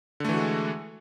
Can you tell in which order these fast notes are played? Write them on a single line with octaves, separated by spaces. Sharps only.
D3 A3 E3 F#4 G#3